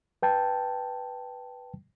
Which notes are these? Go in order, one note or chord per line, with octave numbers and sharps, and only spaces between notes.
B4 G5 A5